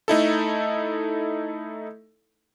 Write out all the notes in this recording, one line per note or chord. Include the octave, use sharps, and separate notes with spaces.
A3 D#4 E4 A4